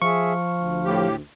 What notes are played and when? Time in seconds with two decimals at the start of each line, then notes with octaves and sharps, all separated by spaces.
0.02 F3 G#4 E5 C#6
0.51 D2
0.85 A2 G4